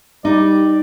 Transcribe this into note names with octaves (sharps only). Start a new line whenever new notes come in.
G3 D#4 D5